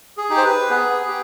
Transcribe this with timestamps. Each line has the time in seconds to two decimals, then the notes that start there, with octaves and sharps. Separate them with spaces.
0.18 G#4
0.30 D#4 G4
0.37 C5
0.44 B4
0.70 B3 G#4
1.08 G4